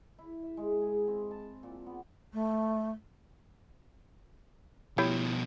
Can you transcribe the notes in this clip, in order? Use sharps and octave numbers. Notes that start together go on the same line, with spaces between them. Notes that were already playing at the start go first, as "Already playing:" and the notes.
E4
E5
G#3
G#4
C4
A5
A#2
B3
A3
B2 F3 E4 G4 C#5